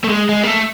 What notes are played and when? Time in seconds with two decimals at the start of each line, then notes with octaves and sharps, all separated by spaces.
0.04 A3
0.09 G#3
0.29 G#3
0.43 A#3
0.47 A3